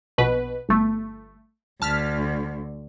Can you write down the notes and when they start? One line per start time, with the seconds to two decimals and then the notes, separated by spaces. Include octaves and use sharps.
0.18 A#1 B2 B4
0.69 G1 A3
1.82 D2 A5 F6 B6